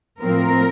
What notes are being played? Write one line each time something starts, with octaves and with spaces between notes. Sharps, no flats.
A2 F3 C4 A#4